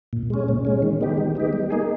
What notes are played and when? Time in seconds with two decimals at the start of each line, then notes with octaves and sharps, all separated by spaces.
0.13 A#2
0.30 G#3 C#4
0.48 A#2
0.65 G#3 C#4
0.82 D#3
1.01 G#3 B3 D#4 G4
1.18 D#3
1.35 G#3 B3 D#4 G4
1.53 G3
1.70 A#3 D#4 G#4